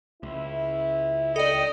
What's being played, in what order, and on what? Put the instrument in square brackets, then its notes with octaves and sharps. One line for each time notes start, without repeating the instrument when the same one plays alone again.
[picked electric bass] C#2 [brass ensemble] E4
[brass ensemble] D4 G5 [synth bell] A4 D5 [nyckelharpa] D#5